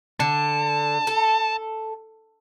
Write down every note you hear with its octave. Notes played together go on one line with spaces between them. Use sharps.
D3 A5
A4